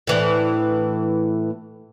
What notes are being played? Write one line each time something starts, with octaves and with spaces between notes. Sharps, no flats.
A2 E3 D4